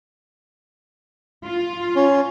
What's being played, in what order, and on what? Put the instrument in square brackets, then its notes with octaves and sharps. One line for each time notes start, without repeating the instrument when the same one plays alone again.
[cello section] F4
[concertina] C#4